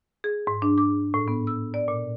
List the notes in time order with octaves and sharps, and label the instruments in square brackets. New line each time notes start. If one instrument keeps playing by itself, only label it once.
[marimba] G#4
G#2
D4
D6
A2
B3
E6
D5
A#2